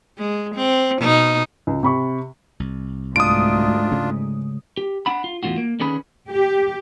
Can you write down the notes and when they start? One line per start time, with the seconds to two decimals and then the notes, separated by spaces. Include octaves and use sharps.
0.18 G#3
0.55 C4
1.00 B2 D#4
1.67 C#2
1.83 C3 B5 C#6
2.60 C2
3.16 D2 G#2 D4 F4 D#6 D7
3.92 C#3 G#3 C#4
4.77 G4
5.06 D4 F#5 B5
5.24 F4
5.43 E2 A2 G3 C#4 F4 F#4
5.58 A#3
5.80 D3 D#3 C#4 G#4 B4 B5
6.28 G4